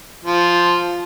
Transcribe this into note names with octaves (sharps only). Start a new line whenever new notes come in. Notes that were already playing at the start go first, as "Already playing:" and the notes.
F3